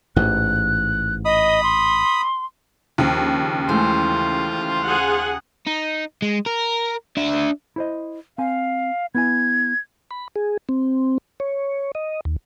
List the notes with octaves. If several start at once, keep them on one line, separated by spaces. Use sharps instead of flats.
A1 G#2 E3 F#6
D#5 B5 D#6
C6
D#2 C#3 F3 D4
E3 G#3 A3 F4 C5
G#4 F#5
D#4
G#3
A#4
D4 E5
E4 C5 D#5
C4 F5 G#5
B3 E4 G#5 G#6
B5
G#4
C4
C#5
D#5
D#2